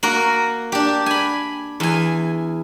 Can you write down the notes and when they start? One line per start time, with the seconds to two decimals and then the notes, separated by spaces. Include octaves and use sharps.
0.03 A#3 F#4 A#4
0.72 D4 G4
1.06 G#5 B5
1.80 E2 G#5